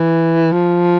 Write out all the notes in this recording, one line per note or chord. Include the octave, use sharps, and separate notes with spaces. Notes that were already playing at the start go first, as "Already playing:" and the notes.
Already playing: E3
F3